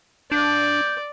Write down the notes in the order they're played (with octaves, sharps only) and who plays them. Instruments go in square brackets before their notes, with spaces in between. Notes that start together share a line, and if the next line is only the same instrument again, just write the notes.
[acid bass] D4 [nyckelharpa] D5 [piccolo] G6